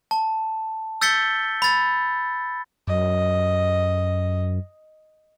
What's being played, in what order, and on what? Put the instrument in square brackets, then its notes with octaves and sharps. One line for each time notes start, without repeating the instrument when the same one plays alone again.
[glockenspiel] A5
E6 G6 A6 B6 C#7 G7
B5 A6
[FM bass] F#2 [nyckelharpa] D#5